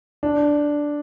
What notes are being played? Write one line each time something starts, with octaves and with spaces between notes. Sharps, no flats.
D4